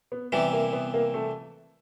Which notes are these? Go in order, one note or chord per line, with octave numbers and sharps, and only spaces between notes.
B3
C3 E3 G3 B3
A#3
B3
A#3
A3